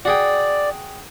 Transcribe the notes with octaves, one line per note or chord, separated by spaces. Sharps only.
F#4 G#4 D5 G5